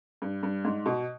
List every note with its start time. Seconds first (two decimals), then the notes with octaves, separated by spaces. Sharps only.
0.22 G2
0.43 G2
0.65 G#2
0.86 B2